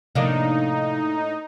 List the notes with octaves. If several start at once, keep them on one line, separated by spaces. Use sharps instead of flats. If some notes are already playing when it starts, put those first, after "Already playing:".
A2 C3 F3 A#3 D4 D#4